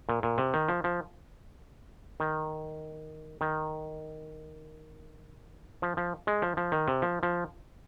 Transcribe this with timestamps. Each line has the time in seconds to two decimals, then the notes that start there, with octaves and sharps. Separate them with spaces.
0.09 A#2
0.23 A#2
0.38 C3
0.54 D#3
0.69 F3
0.84 F3
2.20 D#3
3.41 D#3
5.82 F3
5.97 F3
6.27 G#3
6.42 F3
6.57 F3
6.72 D#3
6.88 C3
7.02 F3
7.23 F3